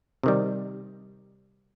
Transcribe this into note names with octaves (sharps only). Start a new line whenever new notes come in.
C3 D#3 G3